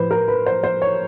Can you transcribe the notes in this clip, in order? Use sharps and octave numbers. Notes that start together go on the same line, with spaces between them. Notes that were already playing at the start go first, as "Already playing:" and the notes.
Already playing: A2 F3 B4 C5
A#4
B4
C5
C5
C#5